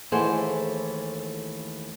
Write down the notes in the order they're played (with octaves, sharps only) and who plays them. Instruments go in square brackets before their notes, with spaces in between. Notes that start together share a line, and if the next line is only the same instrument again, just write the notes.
[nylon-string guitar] D#2 E3 A3 G#4 C5 F#5